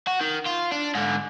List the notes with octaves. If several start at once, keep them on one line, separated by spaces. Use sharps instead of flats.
F#4
D#3
F4
D4
G#2 D3